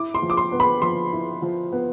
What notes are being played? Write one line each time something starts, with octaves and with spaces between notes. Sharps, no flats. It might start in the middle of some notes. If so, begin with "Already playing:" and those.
Already playing: E4 D6
C6
F3
D6
C6
B3
B5
F3 C6
E4
F3
B3